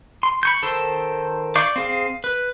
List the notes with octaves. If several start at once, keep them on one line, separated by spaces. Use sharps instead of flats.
C6
B5 C#6 G6
D#3 A4 C5 E6
D5 F5 C#6 D6 G6
C4 G#4 F5
B4